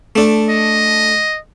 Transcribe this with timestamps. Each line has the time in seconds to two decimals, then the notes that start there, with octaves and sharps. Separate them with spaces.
0.16 A3 D4
0.49 D#5